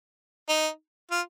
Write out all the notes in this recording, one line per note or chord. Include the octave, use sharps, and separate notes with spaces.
D#4
F4